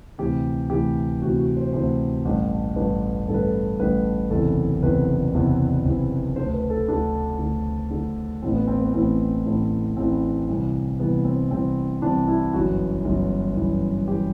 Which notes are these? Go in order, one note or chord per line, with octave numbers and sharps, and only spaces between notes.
D2 C3 E3 G4
D2 C3 E3 G4
D2 C3 E3 F#4
F#4
C5
D2 C3 E3 C5
A1 G2 D3
A1 G2 D3 B4
A1 G2 D3 A4
B4
A4
A1 G2 D3 B4
F#1 E2 C3 E3 A4
F#1 E2 C3 E3 B4
F#1 E2 C3 E3
F#1 E2 C3 E3
D2 D3 C5
B4
A4
D2 D3 D4
D2 D3
D2 D3
A1 A2 E3 C4
B3
C4
B3
A1 A2 E3 C4
A1 A2 E3
A1 A2 E3 C4
C2 C3 E3
C2 C3 E3 B3
C4
C2 C3 E3 C4
C2 C3 E3 D4
E4
G1 F#2 E3 F#4
G1 F#2 E3
G1 F#2 E3
E3 G4